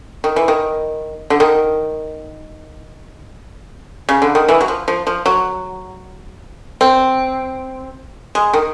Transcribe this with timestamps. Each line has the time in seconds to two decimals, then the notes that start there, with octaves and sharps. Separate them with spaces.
0.24 D#3
0.36 E3
0.48 D#3
1.30 D3
1.40 D#3
4.09 C#3
4.22 D3
4.35 D#3
4.49 E3
4.61 F#3
4.68 F3
4.88 F3
5.07 F3
5.26 F#3
6.81 C4
8.35 G#3
8.53 D#3